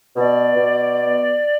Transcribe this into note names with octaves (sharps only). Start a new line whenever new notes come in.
B2 D5
B2
B3